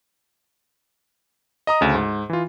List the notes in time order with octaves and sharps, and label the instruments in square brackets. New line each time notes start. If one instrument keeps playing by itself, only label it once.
[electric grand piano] D#5 A#5 D#6
D2 C#3
G#2
E3 F4